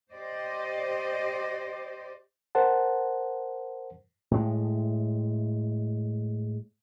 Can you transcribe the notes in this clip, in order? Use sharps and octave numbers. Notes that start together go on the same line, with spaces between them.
G4 C5 D5 D#5
A#4 C5 F#5 A5
A2 G#3